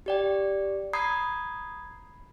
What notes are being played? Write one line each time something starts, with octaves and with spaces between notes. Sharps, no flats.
G4 D5 G5
A#5 B5 D#6 G6 G#6 C7